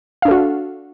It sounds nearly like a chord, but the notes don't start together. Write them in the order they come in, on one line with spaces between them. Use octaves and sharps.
F5 D4 A4 F#4